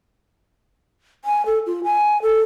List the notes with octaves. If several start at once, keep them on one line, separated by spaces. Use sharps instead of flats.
G#5
A4
F4
G#5
A4